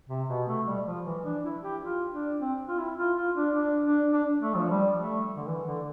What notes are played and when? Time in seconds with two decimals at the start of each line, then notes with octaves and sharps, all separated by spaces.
0.09 C3
0.28 B2
0.48 A3
0.67 G3
0.86 F3
1.05 E3
1.24 D4
1.44 E4
1.63 G4
1.82 F4
2.11 D4
2.40 C4
2.68 F4
2.78 E4
2.97 F4
3.17 F4
3.36 D4
3.55 D4
3.84 D4
4.12 D4
4.42 A3
4.55 F3
4.70 G3
5.00 A3
5.36 D3
5.47 E3
5.66 D3